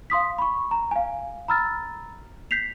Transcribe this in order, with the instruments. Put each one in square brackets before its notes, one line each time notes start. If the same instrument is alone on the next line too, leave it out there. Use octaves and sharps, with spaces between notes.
[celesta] F5 C6 D#6 B6
B5 C#6
A#5
F5 G#5
A#5 B5 E6 F6 A6
G6 B6 C7 F7